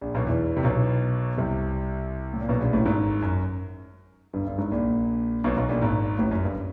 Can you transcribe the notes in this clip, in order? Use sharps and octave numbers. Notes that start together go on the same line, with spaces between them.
A#1 A#2
B1 B2
E2 E3
C3
B1 B2
C2 C3
A2
A#2
B1 B2
A#1 A#2
A1 A2
G#1 G#2
F#2
G1 G2
G1 G2
G#1 G#2
A#1 A#2
B1 B2
B1 B2
A#1 A#2
G#1 G#2
A1 A2
F#2
G1 G2